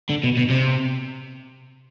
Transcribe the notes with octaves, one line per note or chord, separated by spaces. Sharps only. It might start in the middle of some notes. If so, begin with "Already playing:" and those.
D3
B2
B2
C3